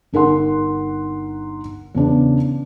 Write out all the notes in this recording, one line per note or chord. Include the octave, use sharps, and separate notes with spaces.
G1 D#4 A#4 F#5 C6
E2 C#3 D4